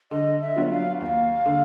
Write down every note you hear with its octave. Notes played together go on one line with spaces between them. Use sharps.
D3 D#5
E5
F#3 B3 D4 F4
F5
D#2 F5
D3